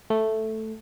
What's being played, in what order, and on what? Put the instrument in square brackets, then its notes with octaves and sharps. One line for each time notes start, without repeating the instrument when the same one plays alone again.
[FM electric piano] A3